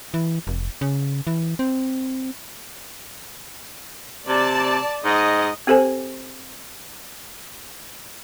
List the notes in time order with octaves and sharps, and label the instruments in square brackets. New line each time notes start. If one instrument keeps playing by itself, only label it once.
[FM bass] E3
F1
C#3
E3
C4
[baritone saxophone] C3 [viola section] D5 A5
[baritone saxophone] G#2 [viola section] D#5
[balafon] C4 G4 A4 C5 G#5